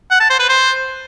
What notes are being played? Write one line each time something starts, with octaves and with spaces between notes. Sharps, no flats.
F#5
A5
C5
B4
C5